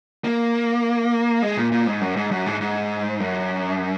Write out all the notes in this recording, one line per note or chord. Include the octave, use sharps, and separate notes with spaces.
A#3
G#3
A#2
A#2
G#2
F#2
G#2
F#2
G#2
G#2
F#2